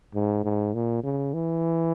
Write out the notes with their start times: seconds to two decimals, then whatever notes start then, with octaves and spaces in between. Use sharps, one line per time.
0.14 G#2
0.44 G#2
0.74 A#2
1.03 C#3
1.33 E3